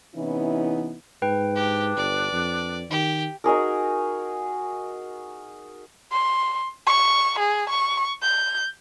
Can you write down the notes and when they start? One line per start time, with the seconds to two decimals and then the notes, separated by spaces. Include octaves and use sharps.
0.15 C3 E3 B3 C#4 D#4 E4
1.22 G#2 B4 G5
1.55 D4 G4
1.97 G1 D5
2.32 F2
2.90 D#3 G4
3.44 D#4 F#4 G#4 A#4
6.12 C6
6.87 C#6
7.39 G#4
7.70 C#6
8.23 G6